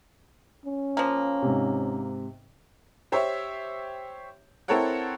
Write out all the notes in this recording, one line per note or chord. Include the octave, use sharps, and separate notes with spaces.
C#4
F3 A#3
G#2 C3
G4 C5 C#5 E5
C4 E4 A4 A#4 C#5 F#5